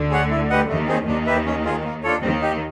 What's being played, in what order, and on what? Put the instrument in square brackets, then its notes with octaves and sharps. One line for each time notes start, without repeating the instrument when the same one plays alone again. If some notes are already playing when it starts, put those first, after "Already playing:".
Already playing: [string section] D2 D3
[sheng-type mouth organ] G#4 C#5 F#5
E4
G4 B4 D#5 F#5
[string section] D#2 D#3 [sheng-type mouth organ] A3
[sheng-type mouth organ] C4 D#4 G#4
[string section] D#2 D#3 [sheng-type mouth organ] D4
[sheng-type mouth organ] G4 B4 E5
C#4
F4 G#4
A#3
D4 F4 A4 C#5
[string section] D#2 D#3 [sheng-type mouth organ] C4
[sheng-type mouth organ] D#4 G4